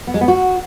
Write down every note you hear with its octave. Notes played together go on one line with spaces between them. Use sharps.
B3
G#3
B3
F#4